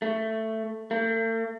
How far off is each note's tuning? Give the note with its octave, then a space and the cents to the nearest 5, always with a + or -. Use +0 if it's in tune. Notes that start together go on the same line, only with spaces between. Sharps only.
A3 +10
A3 +45